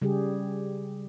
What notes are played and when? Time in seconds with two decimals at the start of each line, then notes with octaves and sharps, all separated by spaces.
0.02 C#3 G3 G4 G#4